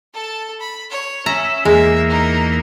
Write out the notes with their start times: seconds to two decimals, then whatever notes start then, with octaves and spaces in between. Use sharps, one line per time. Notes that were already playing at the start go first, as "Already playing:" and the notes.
0.14 A4 A5
0.60 B5
0.90 C#5
1.26 C#4 E5 A#5
1.65 E2 G#3 A#3 E5
2.09 D#4 A#4